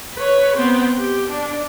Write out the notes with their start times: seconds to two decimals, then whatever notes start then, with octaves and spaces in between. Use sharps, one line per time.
0.15 B4 C#5
0.56 B3 C4
0.97 G4
1.30 D4